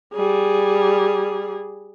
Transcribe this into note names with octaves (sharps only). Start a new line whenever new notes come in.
G3 G#4